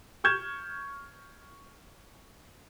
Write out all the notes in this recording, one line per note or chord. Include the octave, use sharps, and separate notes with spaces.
C#6 F6 G6 G#6 E7